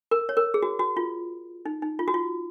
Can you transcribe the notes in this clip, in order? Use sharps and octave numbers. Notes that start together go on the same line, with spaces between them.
A#4
C#5
A#4
G#4
F#4
F#4
F4
D#4
D#4
F4
F#4
F4